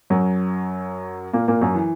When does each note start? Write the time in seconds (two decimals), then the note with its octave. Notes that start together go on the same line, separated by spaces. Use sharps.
0.10 F#2 F#3
1.33 A#2 A#3
1.48 A#2 A#3
1.61 F#2 F#3
1.75 E3